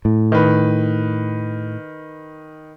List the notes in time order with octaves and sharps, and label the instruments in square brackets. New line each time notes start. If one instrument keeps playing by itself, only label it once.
[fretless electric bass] A2
[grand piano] D#3 B4